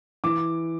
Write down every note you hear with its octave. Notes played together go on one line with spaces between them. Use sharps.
E3 D6